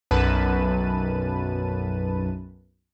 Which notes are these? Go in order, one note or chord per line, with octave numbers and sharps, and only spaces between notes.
B1 F#2 B4 A5 D#7